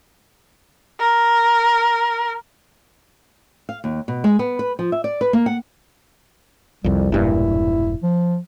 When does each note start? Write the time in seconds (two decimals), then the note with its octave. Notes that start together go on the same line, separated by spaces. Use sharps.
0.99 A#4
3.69 F5
3.84 D#2
4.08 B2
4.24 G#3
4.39 B3
4.59 B4
4.79 F3
4.92 E5
5.04 D5
5.21 B4
5.33 A#3
5.46 F#5
6.84 C2 F2 G3
7.12 E1 G2 A#2 E4
8.03 F3